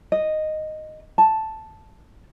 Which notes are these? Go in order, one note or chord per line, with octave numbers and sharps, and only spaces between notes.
D#5
A5